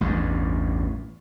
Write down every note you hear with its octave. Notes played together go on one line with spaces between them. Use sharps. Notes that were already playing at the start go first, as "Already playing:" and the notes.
A1 E2 G2